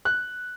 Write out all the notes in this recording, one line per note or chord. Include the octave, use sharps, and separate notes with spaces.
F#6